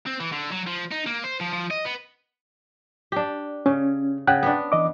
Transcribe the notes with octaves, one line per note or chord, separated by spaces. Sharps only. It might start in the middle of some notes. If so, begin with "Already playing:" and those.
C4
E3
D3
F#3
F3
D#4
A#3
C5
F3
F3
D#5
B3
D4 G4
C#3 C#4
C#3 F#5 G5 F#6
B3 D4
E3 D#5 D6